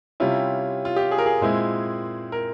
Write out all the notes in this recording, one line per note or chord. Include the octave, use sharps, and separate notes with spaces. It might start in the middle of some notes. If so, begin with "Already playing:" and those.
C3 G3 C#4 E4 F4
F4
G4
G#4
A#4
G#4
A#2 G#3 C4 E4
A#4